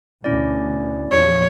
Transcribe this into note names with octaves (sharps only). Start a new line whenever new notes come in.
D2 B2 C#4 E4 D5
E2 A#2 F3 C#5